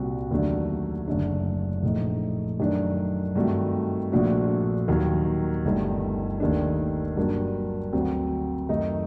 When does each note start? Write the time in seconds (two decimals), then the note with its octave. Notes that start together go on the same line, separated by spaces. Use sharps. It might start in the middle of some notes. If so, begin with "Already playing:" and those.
Already playing: C2 A#2 G3 C4 F#4
0.31 D#2 D3 F#3 A3 D4
1.08 F#1 F#2 D3 A3 D4
1.83 A#1 A2 A3 D#4
2.59 F#2 D#3 A3 D4
3.35 G2 D#3 A3 C4 F#4
4.12 A#1 A#2 A3 D4 F#4
4.88 D#2 D#3 F#3 A#3
5.65 G1 G2 D#3 A3
6.40 D#2 D#3 A3 D4
7.17 G2 F#3 A#3 D4
7.93 D2 D3 F#3 C4
8.69 F#2 D#3 A3 D#4